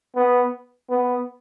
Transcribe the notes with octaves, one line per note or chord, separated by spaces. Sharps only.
B3
B3